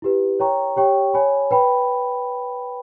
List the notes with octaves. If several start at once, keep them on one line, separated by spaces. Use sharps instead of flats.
E4 G4 B4
C#5 G5 A#5 C#6
G4 C#5 G5 C#6
C#5 G#5 B5
B4 G5 B5